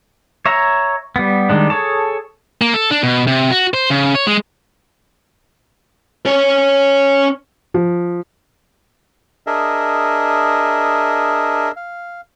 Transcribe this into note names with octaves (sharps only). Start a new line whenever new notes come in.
C#5 E5 A#5
G3 B3
D#3 G3 G#3 D4
G#4 A4 C#5 A5
A#3
A4
D4
B2
C3
F#4
C5
C#3
C#5
G#3
C#4 C#5
F3
D4 G#4 A#4 D#5 E5
F5